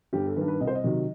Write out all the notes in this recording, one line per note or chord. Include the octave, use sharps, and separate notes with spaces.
G1 G4
A4
G2 D#3 B4
B4
C2 D#5
C5
D#5
C3 D#3 F#3